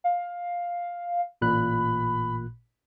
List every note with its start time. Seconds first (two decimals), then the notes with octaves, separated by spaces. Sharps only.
0.04 F5
1.41 A1 A#2 B5 F#6